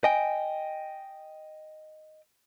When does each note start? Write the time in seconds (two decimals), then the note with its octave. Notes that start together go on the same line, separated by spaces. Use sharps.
0.04 D#5 G5 G#5